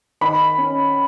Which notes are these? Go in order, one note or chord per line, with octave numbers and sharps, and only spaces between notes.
D#3 B5
C#4